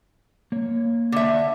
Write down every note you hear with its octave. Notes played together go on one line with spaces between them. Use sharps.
A#3 C#5
D3 E5